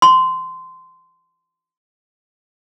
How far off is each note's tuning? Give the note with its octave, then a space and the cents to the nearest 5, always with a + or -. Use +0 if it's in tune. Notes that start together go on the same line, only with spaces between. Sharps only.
C6 -20